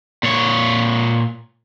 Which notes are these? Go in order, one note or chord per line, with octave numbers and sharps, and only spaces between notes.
A#2 C#5